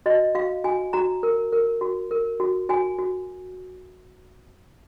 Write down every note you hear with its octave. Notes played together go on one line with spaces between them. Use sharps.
F#4 D#5
F#4 F5
F#4 G#5
F#4 A#5
A#4
A#4
F#4
A#4
F#4
F#4 G#5
F#4